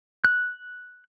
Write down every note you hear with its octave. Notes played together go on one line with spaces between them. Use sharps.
F#6